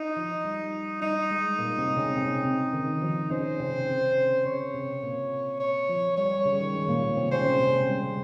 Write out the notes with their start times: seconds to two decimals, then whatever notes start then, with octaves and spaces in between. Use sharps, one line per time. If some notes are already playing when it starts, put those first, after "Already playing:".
Already playing: D#4
0.17 F3
0.45 G3
1.02 G3 D#4
1.31 G#3
1.59 A#2 A#3
1.78 C3 C4
1.97 C#3 C#4
2.16 C3 C4
2.45 C#3
2.73 D#3
3.02 F3
3.30 C#3 C#4 C5
3.60 C3 C4
3.88 C#3 C#4
4.45 C#3 C#4 C#5
4.74 C3 C4
5.02 A#2 A#3
5.60 C#5
5.89 F3
6.17 G3 C#5
6.31 G3
6.45 C#3
6.60 D#3
6.74 G#3
6.88 A#2 A#3
7.03 A#2 A#3
7.17 C3 C4
7.31 C#3 C#4 C5
7.46 C#3 C#4
7.60 C3 C4
7.75 G#3
7.89 G3